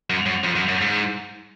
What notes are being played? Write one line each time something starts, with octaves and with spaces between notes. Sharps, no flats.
F#2
F#2
F2
F#2
F#2
G#2